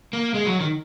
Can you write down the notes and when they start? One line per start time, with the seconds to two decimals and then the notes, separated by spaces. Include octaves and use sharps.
0.13 A#3
0.34 G#3
0.46 F#3
0.60 D#3